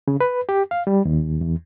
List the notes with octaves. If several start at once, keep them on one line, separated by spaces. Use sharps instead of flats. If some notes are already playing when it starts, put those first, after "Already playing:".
C#3
B4
G4
F5
G3
D#2
E2